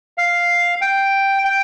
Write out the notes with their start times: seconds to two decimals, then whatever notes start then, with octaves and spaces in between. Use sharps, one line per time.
0.18 F5
0.81 G5
1.45 G5